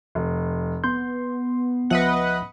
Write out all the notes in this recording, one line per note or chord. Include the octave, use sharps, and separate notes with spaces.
F1
B3 C6 G6
C#2 F3 B4 D#5 E5 F#5